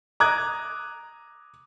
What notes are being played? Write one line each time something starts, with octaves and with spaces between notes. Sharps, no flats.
A#5 D6 D#6 F#6 G#6